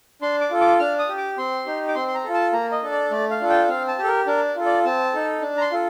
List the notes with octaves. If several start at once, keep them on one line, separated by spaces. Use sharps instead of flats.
D4 C6
D6
F4 A4
D6
D4 F6
D#6
G4
D6
C4 C6
D#4 G4
D6
C4 C6
C6
A#5
F4 A4
A5
A#3 A#5
D#5
D4 A4
D5
A3 D5
F5
D4 F4 A4
G5
C4 F5
A5
G4
A4
A#4
D4 A#4
F4 A4
D5
C4 A5
D#4 A4
D4
A#5
C6
F4 A4